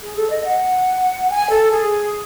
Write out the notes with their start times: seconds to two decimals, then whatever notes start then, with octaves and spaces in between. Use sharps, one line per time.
0.02 G#4
0.16 A4
0.30 D#5
0.45 F#5
1.30 G#5
1.50 A4
1.72 G#4